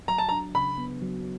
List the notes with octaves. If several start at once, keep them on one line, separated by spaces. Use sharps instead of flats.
F#3 A#5
A5
D4 A#5
C#3 B5
B3
F#3